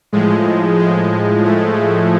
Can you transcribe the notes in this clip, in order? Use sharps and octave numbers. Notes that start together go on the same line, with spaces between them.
A2 F3 G#3
G#3
A3